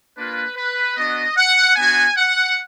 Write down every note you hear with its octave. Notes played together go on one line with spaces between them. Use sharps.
A#3 D4 F4 B4
B4
B3 D4 F#4 D#5
F#5
B3 D4 F#4 G#5
F#5